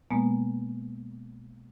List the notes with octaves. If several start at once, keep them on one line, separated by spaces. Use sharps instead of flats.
B2 G#3 A#3 B3